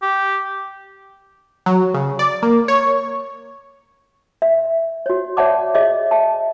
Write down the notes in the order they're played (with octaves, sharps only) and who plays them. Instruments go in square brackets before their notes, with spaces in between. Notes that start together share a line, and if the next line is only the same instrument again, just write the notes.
[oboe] G4
[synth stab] F#3
C#3
D5
A#3
C#5
[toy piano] E5
F#4 C#5
C#5 D5 E5 F#5 A5 D6
G#4 C#5 D#5 E5
E5 A5